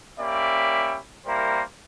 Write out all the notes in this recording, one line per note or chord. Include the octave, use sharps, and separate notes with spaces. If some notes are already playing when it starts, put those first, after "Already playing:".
A#3 C#4 G4 D5 E5 B5
G3 A#3 E4 A#4 C5 A#5